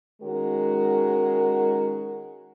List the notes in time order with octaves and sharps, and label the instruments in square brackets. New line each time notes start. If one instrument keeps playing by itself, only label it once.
[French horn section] D#3 G#3 C#4 F#4 A#4